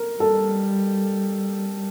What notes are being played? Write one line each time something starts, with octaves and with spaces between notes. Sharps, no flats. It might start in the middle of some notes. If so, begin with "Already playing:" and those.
Already playing: A#4
G3 A4